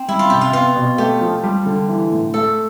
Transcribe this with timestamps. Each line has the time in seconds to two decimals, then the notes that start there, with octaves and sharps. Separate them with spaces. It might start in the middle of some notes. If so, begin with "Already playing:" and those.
Already playing: C4
0.08 G3 E4
0.19 F4
0.30 C3 G4
0.41 F4
0.53 B3 F4
0.76 B2
0.98 A3 G4
1.21 F3
1.44 G3
1.66 D3
1.89 E3
2.11 A2
2.34 A3 A4